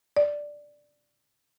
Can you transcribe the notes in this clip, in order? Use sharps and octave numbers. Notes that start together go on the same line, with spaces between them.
D5